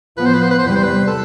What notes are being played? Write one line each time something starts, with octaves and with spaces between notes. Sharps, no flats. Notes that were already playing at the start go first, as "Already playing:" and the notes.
A2 F3 B3 B4
C5
B4
C5
B4
C5
E2 C3 G3 B4
C5
B4
A4